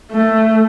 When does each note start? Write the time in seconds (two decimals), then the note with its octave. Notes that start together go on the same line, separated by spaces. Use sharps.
0.12 A3